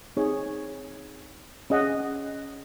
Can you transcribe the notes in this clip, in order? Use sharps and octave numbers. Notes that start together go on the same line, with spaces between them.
C4 D#4 G#4 C#5
C#4 G#4 D#5 F#5